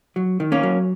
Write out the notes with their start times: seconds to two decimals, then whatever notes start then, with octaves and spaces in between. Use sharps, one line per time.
0.16 F#3
0.40 D#3
0.52 A#3 C#4
0.63 F#3